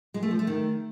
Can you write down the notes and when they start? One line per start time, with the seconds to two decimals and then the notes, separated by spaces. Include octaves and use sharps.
0.14 G#3
0.23 A3
0.31 F3
0.39 A3
0.47 D#3